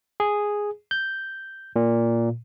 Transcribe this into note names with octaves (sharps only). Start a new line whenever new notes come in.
G#4
G6
A#2